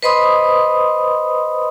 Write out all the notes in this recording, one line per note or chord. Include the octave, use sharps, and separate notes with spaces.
B4 C5 D#5 B5 C6 D#6